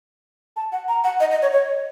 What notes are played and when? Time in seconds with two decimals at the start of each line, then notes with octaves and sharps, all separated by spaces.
0.56 A5
0.72 F#5
0.88 A#5
1.04 F#5
1.20 D#5
1.31 D#5
1.42 C#5
1.52 C#5